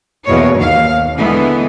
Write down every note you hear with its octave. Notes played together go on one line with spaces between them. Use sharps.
E2 B2 A#3 C#5
D#2 F5
D3 E3 G#3 B3